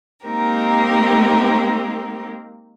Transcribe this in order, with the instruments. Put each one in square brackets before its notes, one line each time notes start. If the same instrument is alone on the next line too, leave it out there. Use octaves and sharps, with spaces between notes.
[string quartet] G#3 A#3 C4 D#4 G4 A#4